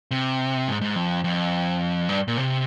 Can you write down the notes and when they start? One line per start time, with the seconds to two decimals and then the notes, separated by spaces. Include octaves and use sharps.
0.11 C3
0.68 G#2
0.81 G#2
0.96 F2
1.24 F2
2.09 G2
2.28 A#2
2.37 C3